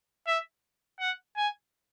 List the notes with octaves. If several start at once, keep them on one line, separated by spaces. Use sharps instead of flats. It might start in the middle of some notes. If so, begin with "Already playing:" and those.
E5
F#5
G#5